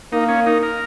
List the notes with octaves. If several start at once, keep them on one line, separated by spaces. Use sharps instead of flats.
A#3 D#4
C#4
D#4
A#4